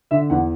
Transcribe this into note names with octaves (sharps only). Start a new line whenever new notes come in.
D3 E5
E2 F#5